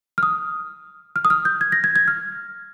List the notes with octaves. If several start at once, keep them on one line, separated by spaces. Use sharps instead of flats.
F6
D#6
F6
D#6
F6
G6
G#6
A#6
G#6
G#6
F6